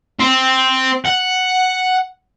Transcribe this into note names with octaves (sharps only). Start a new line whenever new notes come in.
C4
F#5